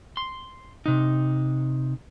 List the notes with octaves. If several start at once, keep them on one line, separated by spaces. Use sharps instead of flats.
C6
C3 D#4